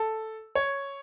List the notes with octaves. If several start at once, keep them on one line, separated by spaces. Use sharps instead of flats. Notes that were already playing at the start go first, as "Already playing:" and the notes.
Already playing: A4
C#5